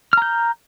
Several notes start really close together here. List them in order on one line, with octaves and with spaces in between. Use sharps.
F6 A#5 G6